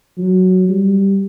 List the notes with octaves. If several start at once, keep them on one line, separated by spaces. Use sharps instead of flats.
F#3
G3